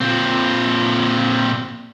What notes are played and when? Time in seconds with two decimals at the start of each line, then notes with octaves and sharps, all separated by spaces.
0.01 A#2 C4